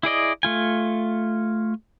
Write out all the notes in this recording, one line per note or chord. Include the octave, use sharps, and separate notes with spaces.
E4 G#4 D5 D#5
A3 F4 G#5